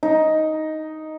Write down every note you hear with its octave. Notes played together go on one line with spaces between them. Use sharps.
D#4